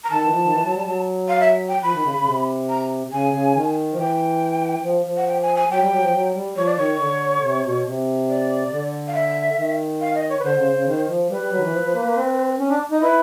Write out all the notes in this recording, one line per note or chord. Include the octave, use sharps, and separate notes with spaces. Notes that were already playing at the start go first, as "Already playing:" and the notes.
A#5
D#3 A5
E3
F3
D#3
E3
F#3
G3
F#3
F5
E5
G5
F3 B5
D#3
C#3
C#3
C3
A#5
C#3 G#5
C#3
D#3
F3
E3 G5
F3
F3
F#5
G5
G#5
G#5
F#3 G5
G3
F#3
F3
F#3
G3
F3 C#5
D5
D#3 C#5
D3
C3
B2
C3
D5
D3
F5
E5
D#3
F5
D#5
C#5
B4
D3 C5
C#3
C#3
D#3
F3
G3 B4
G3
F#3
D#3
E3
F3
F3
A#3
A#3
C4
C#4
D4
D#4
E4 B4